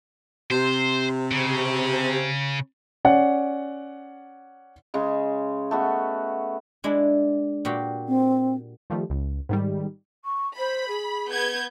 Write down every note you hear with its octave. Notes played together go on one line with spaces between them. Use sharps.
C3 C5
C#3
C#4 D5 F#5
C#3 G#3
A3 B3 F#4
G#3 D4 E4
A#2 F#4 G4
C4
D#3 F3 G3 A3
C#2
G#2 D#3 G3
C#6
C5 B5
G#4
B3 G6 G#6